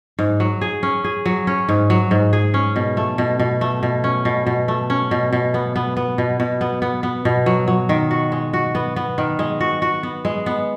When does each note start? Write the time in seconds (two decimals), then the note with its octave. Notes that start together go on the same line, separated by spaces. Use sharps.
0.19 G#2
0.40 F#3
0.61 G#4
0.83 C#4
1.04 G#4
1.26 F#3
1.47 C#4
1.69 G#2
1.90 F#3
2.11 G#2
2.33 G#4
2.54 C#4
2.76 B2
2.97 A3
3.18 B2
3.39 B2
3.61 A3
3.83 B2
4.04 C#4
4.25 B2
4.46 B2
4.68 A3
4.90 C#4
5.11 B2
5.33 B2
5.54 B3
5.76 B3
5.97 B3
6.18 B2
6.40 B2
6.61 B3
6.82 B3
7.03 B3
7.25 B2
7.46 F#3
7.68 F#3
7.89 D#3
8.11 F#4
8.32 G#3
8.53 F#4
8.75 B3
8.96 B3
9.18 D#3
9.39 G#3
9.61 F#4
9.82 F#4
10.03 B3
10.25 G#3
10.46 B3